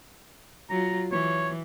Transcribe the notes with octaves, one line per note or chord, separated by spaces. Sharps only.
F#3 F4 A#5
E3 C#5